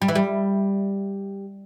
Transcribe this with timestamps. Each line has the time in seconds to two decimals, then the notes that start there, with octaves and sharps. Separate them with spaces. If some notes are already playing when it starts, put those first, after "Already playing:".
0.02 G3
0.08 E3
0.15 G3